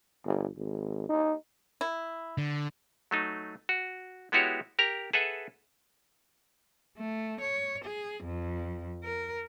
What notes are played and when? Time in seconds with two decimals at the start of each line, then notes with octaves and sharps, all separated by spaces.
0.25 G1
0.56 G#1
1.09 D#4
1.81 E4
2.38 D3
3.11 F#3 A3 D#4
3.69 F#4
4.32 G#3 B3 E4 F#4 G4 C#5
4.79 G4 A#4 A#5
5.13 G#4 A4 B4 E5 F#5
6.98 A3
7.41 C#5
7.84 G#4
8.24 F2
9.04 A#4